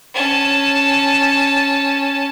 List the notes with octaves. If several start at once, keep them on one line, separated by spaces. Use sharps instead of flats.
C#4 A5